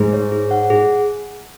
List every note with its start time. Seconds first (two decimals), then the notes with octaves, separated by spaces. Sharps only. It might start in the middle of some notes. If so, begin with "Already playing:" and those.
Already playing: G#2 G#4
0.13 C#5
0.32 G#4
0.51 F#5
0.70 G#4